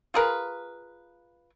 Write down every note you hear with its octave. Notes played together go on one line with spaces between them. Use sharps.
F4 G#4 A#4 B4